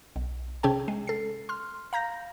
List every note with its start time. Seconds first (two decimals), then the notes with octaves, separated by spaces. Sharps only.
0.16 B1
0.63 C3 C#4 G#4 G5 A5
0.88 G#3
1.07 A4 C7
1.49 C6 F6
1.93 F5 A#5 G6 A#6